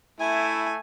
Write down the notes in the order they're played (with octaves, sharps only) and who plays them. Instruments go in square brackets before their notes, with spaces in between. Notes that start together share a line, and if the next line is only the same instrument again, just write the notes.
[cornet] A3 [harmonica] E4 [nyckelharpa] G#5